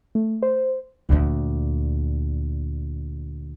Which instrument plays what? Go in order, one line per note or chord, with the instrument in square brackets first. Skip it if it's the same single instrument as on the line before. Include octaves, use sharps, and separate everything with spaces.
[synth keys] A3
C5
[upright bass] D2 A#2